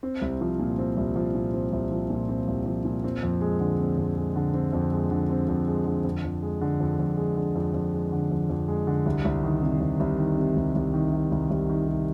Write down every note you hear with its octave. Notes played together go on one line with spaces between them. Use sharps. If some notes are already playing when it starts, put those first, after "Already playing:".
C4
C2
F3
A#2
C4
C2
F3
A#2
C4
C2
F3
A#2
C4
C2
F3
A#2
C4
F2
G#3
D3
C4
F2
G#3
D3
C4
F2
G#3
D3
C4
F2
G#3
D3
F2
F2
G#3
D3
F2
F2
G#3
D3
F2
F2
G#3
D3
F2
F2
G#3
D3
C2
C2
D#3
C3
C2
C2
D#3
C3
C2
C2
D#3
C3
C2
C2
D#3
C3